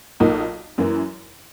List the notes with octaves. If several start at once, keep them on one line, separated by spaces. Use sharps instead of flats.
B1 A#2 A#3 D#4
F#2 E3 A#3 E4